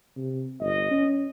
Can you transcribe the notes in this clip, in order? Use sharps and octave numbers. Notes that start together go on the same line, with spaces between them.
C3
G1 D#5
C#4